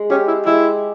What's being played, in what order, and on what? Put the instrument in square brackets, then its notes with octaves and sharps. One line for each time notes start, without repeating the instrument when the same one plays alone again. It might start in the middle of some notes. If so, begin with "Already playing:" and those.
Already playing: [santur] G#3
[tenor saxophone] C#4 [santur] G4
[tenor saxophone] E4
[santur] G#3 [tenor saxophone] E4